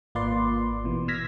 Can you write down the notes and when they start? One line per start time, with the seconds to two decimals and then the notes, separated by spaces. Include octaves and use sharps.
0.15 G#1 A#3 F4 B4 D5 C6
0.85 B2 E3
1.08 E6 F6 G#6 A#6 B6